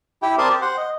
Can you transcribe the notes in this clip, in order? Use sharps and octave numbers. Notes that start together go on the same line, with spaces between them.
E4 G4 G5
C4 A#4 D5 A5 C6 D#6
G4
C5 F#5 C6
D#5